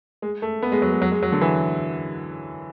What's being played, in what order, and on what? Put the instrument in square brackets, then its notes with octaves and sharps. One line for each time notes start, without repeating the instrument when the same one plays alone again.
[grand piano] G#3
A3
B3
G#3
F#3
G#3
F#3
G#3
F#3
D3
E3